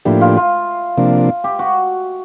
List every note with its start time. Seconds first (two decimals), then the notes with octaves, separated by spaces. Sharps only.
0.05 A2 F3 A#3 D4 E4 G4
0.21 F4
0.37 F4
0.97 C3 F3 A#3 D4
1.44 G4
1.59 F#4